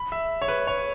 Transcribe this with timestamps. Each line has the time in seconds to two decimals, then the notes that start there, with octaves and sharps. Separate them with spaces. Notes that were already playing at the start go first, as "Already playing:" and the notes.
Already playing: B5
0.12 E5
0.42 C#5
0.48 B4
0.67 C#5